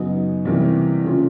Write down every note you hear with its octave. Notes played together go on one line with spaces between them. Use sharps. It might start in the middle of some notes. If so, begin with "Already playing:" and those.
Already playing: F#2 C#3 F#3 B3 D#4
E2 C3 E3 G3 A#3
C#3 F3 A3 C#4 F4